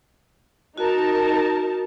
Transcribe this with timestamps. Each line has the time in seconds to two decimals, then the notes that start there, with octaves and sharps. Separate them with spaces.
0.78 D#4 F#4 A#4 A5